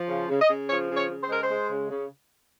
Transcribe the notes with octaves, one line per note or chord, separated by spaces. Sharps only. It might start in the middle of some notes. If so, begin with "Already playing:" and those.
Already playing: F3
C#3
C#3
D#5
C#3
F3 C#5
C#3
C#5
C#3
C5
G#3 A#4
C5
G#3
C#3
C#3